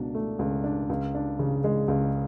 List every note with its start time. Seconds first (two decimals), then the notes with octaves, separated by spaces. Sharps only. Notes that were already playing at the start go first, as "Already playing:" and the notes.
Already playing: C#2 B2 D4
0.15 A3
0.39 C#2
0.64 D4
0.89 C#2
1.15 D4
1.39 C#3
1.64 G#3
1.88 C#2